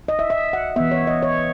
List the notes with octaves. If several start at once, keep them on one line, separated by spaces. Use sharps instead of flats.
D#5
E5
E5
F#5
E3 B3 E5
C#5
D#5
C#5